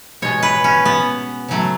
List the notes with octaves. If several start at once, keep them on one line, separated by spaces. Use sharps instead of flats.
B2 G#3 C#5
B4
C#4
B3
C#3 F#3 A3